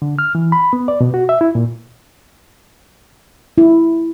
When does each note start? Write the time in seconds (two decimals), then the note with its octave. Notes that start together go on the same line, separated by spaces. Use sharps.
0.02 D3
0.19 F6
0.35 E3
0.52 B5
0.73 B3
0.88 D5
1.01 B2
1.14 F#4
1.29 E5
1.41 E4
1.55 A#2
3.58 E4